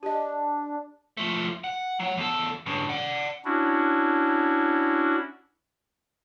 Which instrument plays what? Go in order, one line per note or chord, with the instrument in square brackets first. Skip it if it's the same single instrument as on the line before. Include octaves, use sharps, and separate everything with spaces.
[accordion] D4 [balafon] G4 D#5
[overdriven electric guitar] F3 A3
F#5
F#3 F#5
E2 A4
G2 C#3
D5 F#5
[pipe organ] C#4 D4 E4 F#4